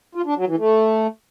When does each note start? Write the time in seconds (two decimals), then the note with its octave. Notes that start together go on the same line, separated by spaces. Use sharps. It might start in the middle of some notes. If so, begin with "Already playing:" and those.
0.15 F4
0.26 D4
0.37 F#3
0.47 E3
0.58 A3